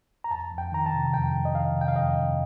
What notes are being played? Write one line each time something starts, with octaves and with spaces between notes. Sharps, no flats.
A#5
F2 A5
F2
G5
D#3 A#5
A5
C3
F2 G5
F2
D#5
D#3 F5
C3
G5
F5
F2 D#5
F2